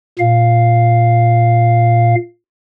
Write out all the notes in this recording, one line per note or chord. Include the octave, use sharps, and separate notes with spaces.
A#2 F5